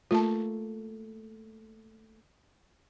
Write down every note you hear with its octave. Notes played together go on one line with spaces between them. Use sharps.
A3 A#3 F4 A5